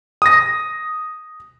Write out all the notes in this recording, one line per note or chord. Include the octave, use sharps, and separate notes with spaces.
D#6 A#6